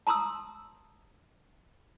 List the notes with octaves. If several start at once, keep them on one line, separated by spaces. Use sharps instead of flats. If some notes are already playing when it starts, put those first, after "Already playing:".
A5 A#5 C6 D#6 E6